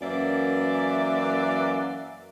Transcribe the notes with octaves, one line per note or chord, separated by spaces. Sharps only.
F#2 E3 A#3 D5